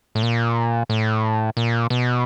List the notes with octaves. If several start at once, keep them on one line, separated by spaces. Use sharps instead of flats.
A2
A#2
A2
A#2
B2